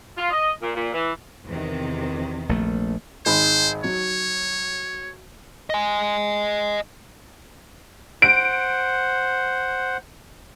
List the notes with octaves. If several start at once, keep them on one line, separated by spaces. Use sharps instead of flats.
F4
D#5
A#2
A#2
E3
E2 C3 D#3
A#1 A3
G#1 G#3 C5 B5
F#3 C#5
D#5 G#5
C5 F#5 D7